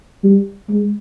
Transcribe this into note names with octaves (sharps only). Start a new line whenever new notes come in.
G3
G#3